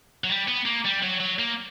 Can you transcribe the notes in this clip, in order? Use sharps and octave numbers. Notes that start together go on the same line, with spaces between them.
F#3
G3
B3
A#3
G3
F#3
F#3
A#3